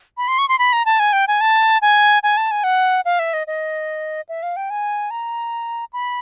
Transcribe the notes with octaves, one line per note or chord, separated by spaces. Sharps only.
B5
C6
C#6
C6
B5
A#5
A5
G#5
G5
G#5
A5
G#5
G#5
A5
G#5
F#5
F5
E5
D#5
D#5
E5
F5
G5
G#5
A#5
B5